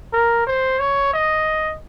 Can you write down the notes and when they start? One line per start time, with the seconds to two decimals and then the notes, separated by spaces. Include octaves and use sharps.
0.13 A#4
0.47 C5
0.79 C#5
1.13 D#5